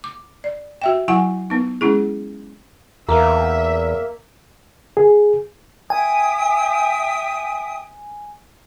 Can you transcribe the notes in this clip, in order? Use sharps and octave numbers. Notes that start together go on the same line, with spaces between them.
D6
D5
F#4 E5 G5
F#3 E4 F#5 G#5 C#6
B3 D#4
G#3 C#4 E4 G#4
E2 A#3 E5
G#4
E5 G5 G#5 D#6